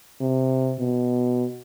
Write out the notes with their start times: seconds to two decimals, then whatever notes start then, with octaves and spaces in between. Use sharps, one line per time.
0.21 C3
0.79 B2